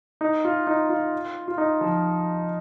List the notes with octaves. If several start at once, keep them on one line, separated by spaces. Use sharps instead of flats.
D#4
F4
D#4
F4
F4
D#4
F3